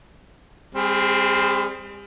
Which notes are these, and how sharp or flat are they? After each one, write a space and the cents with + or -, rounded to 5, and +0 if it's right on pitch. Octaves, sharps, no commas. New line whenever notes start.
G3 +40 C4 +0 G#4 +0